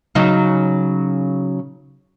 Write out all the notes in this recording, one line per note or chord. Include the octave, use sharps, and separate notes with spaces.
C#3 F#3 D#4